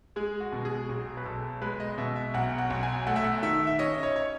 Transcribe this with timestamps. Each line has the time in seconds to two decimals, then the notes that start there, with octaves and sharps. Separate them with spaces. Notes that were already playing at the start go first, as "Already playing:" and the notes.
0.16 G#3 G#4
0.40 F#4
0.53 B2
0.65 G#4
0.89 B1 G#4
1.17 B4
1.25 B1 A4
1.62 G#3 B4
1.80 D#5
1.98 B2 E5
2.16 E5
2.34 B1 F#5
2.58 F#5
2.70 B1
2.83 G#5
3.07 A3 F#5
3.16 E5
3.24 F#5
3.43 D#3 E5
3.67 E5
3.79 C#4 D#5
4.03 C#5
4.16 C#5